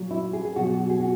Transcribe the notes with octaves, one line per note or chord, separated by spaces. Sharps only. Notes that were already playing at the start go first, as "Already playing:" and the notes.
Already playing: A#2 F#3
E4
G#4
G#4
B2 F#3 F#4
F#4
F#4
G#4
F#4